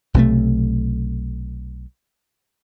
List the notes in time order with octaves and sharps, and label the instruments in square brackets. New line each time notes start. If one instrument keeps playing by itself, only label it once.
[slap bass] B1 C3 E3 A3